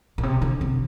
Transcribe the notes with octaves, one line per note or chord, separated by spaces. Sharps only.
A#2
C3
D3
C3